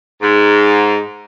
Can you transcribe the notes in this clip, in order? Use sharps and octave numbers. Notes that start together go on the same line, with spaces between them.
G#2